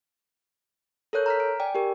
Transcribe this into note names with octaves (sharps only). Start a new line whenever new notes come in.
A4 A#4 C#5 F#6 G6
A#5 F6 B6
D7
D5 G5 G#5
G4 A#4